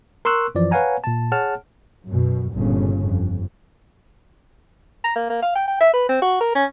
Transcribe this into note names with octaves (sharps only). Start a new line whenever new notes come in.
A#4 C6 C#6 E6 F#6
F#2 E3 F3 D5
B4 C#5 F5 F#5 G#5 A#5
A#2 A5
G#4 C#5 F#5 A5 F6
F#2 B2
G1 A#2 C#3
F2
A#5
A#3
A#3
F5
G5
G5
E5
B4
C4
F#4
A#4
C#4